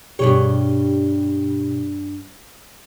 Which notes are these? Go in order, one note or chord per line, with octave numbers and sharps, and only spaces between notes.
G2 B2 G4 G#4 C#5